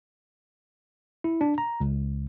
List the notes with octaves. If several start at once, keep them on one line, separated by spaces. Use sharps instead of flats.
E4
D4
A#5
C#2